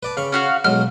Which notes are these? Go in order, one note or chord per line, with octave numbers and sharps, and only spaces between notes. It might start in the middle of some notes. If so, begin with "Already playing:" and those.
B4 D5 A5
C#3 F5 B5 C#6
C#4 F#4 F5
B1 F#3 G#3 F6